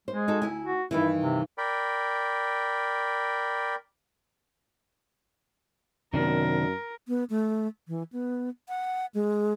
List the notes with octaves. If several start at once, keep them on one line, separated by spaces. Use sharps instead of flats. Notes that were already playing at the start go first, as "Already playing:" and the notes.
G#3 C5
D#4 F#4 A4
D2 E4 G#5
F#4
G2 D#3 E3 E4
C3
A#4 D5 G5 B5
F#2 C3 D#3 B3 D4 A#4
B3
A3
E3
B3
F#5
G#3